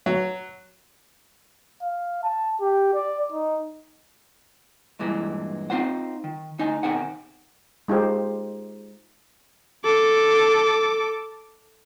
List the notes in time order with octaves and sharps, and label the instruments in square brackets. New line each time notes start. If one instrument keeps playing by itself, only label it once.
[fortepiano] F#3
[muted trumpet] F5
A5
G4
D5
D#4
[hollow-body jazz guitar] G2 A#2 E3 G#3
C4 D#4 F4 C5 F#5
D#3
D2 D#4 D#5 G#5
B2 D#3 C4 G#4 F#5
[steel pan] G#3 D#4 F4 G4 C5
[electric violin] A4 D6